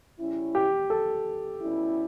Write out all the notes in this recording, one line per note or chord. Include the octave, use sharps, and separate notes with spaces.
C#3 G3 C#4 E4
G4
A4
B2 G3 C#4 E4